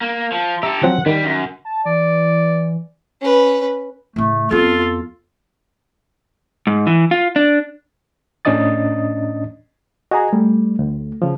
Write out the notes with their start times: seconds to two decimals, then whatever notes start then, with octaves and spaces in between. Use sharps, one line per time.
0.01 A#3
0.32 F3
0.63 G4 A4 E5 A#5
0.83 F3 F#3 C4 F#5
1.06 D#3 G3
1.24 F#2
1.65 A5
1.86 E3 D5
3.21 C#4 B4
4.16 A2 C#3 A3
4.51 F2 B3 F4 A4
6.67 G#2
6.87 E3
7.11 F4
7.36 D4
8.45 A2 C#4 D4 D#5 D#6 A6
10.11 F#4 G#4 D#5 G#5 A#5
10.33 G3 A3
10.79 D2
11.22 C#3 F3